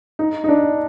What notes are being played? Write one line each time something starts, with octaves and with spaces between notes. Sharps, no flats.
D#4
D#4
D4